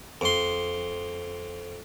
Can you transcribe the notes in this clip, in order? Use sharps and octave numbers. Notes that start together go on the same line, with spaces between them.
F2 C6